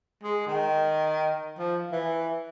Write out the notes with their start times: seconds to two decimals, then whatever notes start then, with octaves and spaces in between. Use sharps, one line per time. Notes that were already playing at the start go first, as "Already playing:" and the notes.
0.23 G#3
0.47 D#3
1.59 F3
1.92 E3